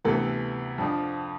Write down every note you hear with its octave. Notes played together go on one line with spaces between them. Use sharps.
D2 C3 E3 B3 A4
F2 D3 F3